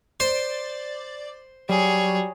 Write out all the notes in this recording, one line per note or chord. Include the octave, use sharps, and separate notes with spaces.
C5 D5
F#3 G3 G#4 C#5